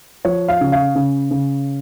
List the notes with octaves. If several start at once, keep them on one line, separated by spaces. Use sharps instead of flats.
F3 C#5
F5
C#3
F5
C#3
C#3